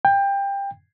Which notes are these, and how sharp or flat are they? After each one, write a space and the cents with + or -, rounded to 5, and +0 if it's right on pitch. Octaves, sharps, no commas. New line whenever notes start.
G5 +20